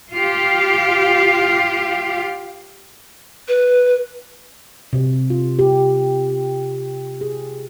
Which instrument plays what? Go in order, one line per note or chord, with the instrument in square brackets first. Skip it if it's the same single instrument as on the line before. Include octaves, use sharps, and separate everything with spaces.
[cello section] F4 G4 F5
[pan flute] B4
[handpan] C3
F4
G4
G#4